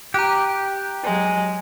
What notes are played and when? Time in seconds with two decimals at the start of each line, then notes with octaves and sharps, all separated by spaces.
0.14 G4 A#5 F#6
1.04 F#3 G#3